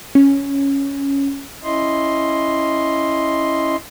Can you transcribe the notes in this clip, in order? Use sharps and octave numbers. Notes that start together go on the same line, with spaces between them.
C#4
C#4 E4 D#5 C6